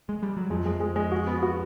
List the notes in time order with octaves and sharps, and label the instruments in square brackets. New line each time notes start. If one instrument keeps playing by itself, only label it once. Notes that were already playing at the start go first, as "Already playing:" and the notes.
[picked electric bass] G#3
G3
F#3
[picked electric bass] F2 F3 [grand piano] G#3
[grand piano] G#3
G#3
G#3
F#4
B3
F#4